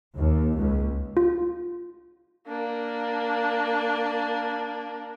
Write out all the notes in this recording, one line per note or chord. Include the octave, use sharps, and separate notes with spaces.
D#2
C#2
F4
A#3 D4